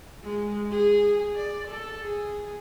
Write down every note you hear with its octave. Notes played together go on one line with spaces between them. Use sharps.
G#3
G#4
D5
A4
G#4